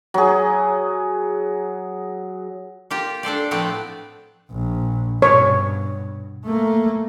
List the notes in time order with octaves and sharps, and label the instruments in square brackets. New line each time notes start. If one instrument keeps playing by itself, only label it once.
[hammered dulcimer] F#3 G#4
[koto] A#3 F4 G4
D4 A4 C5 D5
A2 F3 A3 B3 C4 D5
[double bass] A#1
[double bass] G2 B2 [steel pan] C#5
[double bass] A3 A#3